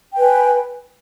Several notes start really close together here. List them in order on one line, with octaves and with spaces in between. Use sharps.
G5 B4 G#5